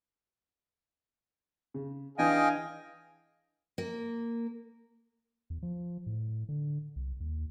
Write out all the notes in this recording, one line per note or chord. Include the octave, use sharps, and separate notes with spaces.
C#3
E3 D4 G#4 D#5 F5 G5 G#5
A#3
E2
F3
A2
D3
C2
D#2